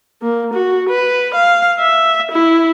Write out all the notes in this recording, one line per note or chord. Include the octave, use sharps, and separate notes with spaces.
A#3
F#4
B4
F5
E5
E4